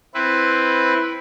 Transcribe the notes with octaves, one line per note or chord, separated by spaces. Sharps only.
C4 E4 B4